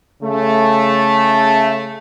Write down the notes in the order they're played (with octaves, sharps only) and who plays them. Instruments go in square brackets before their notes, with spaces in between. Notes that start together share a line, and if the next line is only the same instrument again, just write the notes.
[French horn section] C#3 A3